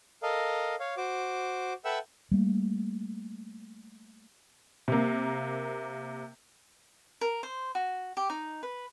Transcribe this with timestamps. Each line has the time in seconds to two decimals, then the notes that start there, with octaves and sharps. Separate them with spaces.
0.23 A4 A#4 D#5 F5
0.80 C#5 F5
0.97 F#4 C5 D6
1.85 A4 B4 E5 F#5 G5 E6
2.31 G3 A3 A#3
4.88 C3 A#3
7.21 A#4
7.43 C5
7.75 F#4
8.17 G4
8.30 D#4
8.63 B4